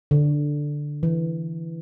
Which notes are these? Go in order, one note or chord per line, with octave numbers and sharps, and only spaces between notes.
D3
E3